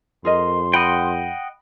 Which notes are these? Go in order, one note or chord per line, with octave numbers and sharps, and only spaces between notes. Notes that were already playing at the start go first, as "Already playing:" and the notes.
F2 G#4 A#4 D#5 C6
D#5 F#5 G5 B5